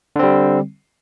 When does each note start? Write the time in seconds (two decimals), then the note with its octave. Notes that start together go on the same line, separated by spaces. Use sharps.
0.16 D3
0.19 C4
0.23 G3